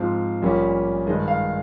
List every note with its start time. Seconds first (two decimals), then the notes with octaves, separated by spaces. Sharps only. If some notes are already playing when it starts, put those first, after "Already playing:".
Already playing: G#2 F3 C4 F5
0.42 A#1 A#2 G3 A#3 C#4
1.06 G2 D#3 G#3 D#5
1.28 F5